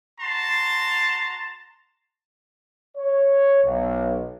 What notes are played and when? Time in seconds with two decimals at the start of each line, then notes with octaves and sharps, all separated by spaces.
0.20 F#4 A5 A#5 C6
2.97 C#5
3.64 B1